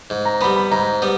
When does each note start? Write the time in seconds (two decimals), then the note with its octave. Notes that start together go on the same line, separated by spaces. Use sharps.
0.10 G#2
0.25 A#5
0.41 G3 B3 B5
0.56 B5
0.71 G#2 A#5
1.02 G3 B3